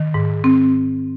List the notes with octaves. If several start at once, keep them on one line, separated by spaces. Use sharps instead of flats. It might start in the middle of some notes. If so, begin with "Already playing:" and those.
Already playing: D#3
G#2
C4